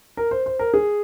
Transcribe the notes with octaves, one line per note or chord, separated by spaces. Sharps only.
A#4
C5
C5
A#4
G#4